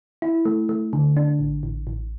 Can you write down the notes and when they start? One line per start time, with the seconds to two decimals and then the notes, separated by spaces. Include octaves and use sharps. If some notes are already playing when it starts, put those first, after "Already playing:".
0.22 E4
0.45 A3
0.69 A3
0.93 D3
1.17 D4
1.39 A1
1.63 A1
1.87 A1